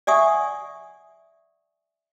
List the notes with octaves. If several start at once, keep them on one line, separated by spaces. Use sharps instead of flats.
D5 E5 F#5 G#5 C#6 D#6